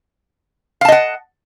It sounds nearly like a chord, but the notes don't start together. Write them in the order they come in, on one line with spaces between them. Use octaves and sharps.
F5 A5 D#5 F#5